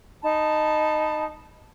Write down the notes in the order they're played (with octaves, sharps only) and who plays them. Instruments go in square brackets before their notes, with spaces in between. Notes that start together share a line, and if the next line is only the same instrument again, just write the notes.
[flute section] D#4 A5 B5